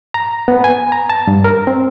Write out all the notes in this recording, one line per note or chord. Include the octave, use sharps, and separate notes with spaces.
A#5
B3
G#5
A#5
A5
G2
A#4
C4